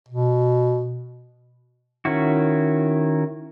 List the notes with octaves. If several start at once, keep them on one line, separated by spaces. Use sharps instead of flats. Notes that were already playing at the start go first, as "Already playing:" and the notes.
B2
D#3 C#4 E4 F#4